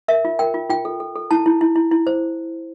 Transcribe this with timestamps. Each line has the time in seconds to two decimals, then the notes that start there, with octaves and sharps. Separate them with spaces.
0.08 A#4 E5
0.25 F4
0.39 A#4 G5
0.54 F4
0.70 F4 G5
0.85 A4
1.00 A4
1.16 A4
1.31 E4 A5
1.46 E4
1.61 E4
1.76 E4
1.91 E4
2.07 C5